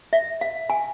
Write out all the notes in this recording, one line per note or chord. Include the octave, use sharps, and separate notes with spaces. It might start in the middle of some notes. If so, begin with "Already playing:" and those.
E5
F5
G#5